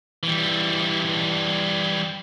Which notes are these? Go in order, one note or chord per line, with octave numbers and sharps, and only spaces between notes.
E3 G3